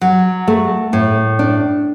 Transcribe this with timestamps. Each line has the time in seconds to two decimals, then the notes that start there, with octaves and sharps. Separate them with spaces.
0.01 F#3
0.48 A3
0.93 A2
1.39 D4